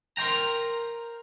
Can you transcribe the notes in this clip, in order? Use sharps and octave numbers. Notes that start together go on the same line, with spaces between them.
A#4 C5 C#5 G5 A#5